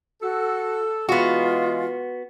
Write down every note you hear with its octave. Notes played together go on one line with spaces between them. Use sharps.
F#4 A4
E3 G#3 B3 F4 F#4